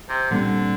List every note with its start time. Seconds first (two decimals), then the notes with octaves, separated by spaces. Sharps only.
0.09 C3
0.31 A#2 D3 G3 C4